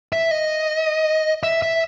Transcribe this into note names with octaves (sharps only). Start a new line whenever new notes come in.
E5
D#5
E5
E5